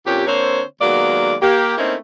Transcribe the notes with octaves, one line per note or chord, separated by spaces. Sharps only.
F2 A#2 C#4 G4
D3 A#3 C4 C5 C#5
D#2 F#3 G#3 A#3 B3 D5
A#3 G4
A3 A#3 C4 C#4 D#4 E4